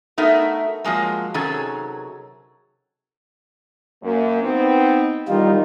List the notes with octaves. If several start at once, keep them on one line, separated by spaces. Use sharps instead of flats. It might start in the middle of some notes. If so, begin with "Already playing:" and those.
A3 B3 D#4 F#4 A#4 E5
F3 F#3 G#3 A#3
C3 D#3 F#3 C#4 G#4 A4
F#2 A#3
B3 C4 D#4
E2 D#3 G3 D#4 F4